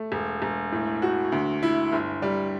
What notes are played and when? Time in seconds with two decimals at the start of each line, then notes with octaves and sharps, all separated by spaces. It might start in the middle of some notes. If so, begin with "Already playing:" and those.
Already playing: A3
0.12 E1
0.42 E1
0.72 A2
1.02 F#4
1.32 D2
1.63 E4
1.92 G1
2.22 G3